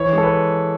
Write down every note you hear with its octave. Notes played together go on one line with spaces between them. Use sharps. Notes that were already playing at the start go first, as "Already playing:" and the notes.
Already playing: E3 C#5
G#3
A4
B4